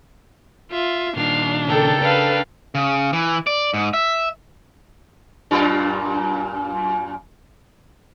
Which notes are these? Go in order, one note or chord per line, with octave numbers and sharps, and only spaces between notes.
F4 E5
A#2 D#3 D4 F5
C#3 A4 A#4 G5
D4 B4 F5
C#3
E3
D5
G#2
E5
F#2 A#2 F4